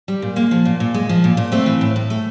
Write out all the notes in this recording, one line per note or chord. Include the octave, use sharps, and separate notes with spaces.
G3
A#2
G#3 A#3
F3
A#2
A#2
G#3
F3
A#2
A#2
A3 C4
E3
A2
A2
A3